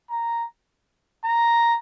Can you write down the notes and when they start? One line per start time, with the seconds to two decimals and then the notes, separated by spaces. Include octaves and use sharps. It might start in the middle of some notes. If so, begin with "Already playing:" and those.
0.11 A#5
1.25 A#5